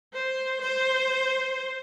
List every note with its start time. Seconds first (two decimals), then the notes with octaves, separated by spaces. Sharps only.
0.14 C5
0.62 C5